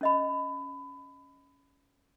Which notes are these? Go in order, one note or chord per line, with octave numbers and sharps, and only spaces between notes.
C#4 D#5 B5